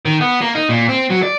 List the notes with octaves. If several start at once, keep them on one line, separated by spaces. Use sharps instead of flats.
D#3
B3
A#3
D#4
A#2
C4
F#3
D5